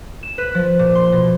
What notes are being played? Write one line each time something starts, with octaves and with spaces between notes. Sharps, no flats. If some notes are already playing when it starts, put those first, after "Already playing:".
E7
B4
F3
A#2
C6
B2